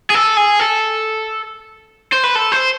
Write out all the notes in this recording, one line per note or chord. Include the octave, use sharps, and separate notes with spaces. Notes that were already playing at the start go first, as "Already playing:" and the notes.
G#4
A4
G#4
A4
C5
B4
A4
C5